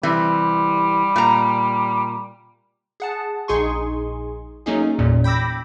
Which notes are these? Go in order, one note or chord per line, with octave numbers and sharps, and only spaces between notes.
C3 E3 G3
A#2 A#5
G#4 F#5 A5
A#1 D#4 G#4 G#5 C6 C#6
F#3 A3 A#3 C#4 D#4 G#4
G1 E2 A#2 C#4
G5 B5 D6 E6 A#6